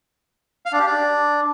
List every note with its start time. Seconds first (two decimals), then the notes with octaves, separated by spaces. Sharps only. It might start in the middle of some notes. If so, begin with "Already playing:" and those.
0.66 F5
0.73 D4
0.79 G4
0.86 D4